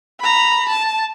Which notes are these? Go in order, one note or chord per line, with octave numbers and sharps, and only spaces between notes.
A#5 B5
A5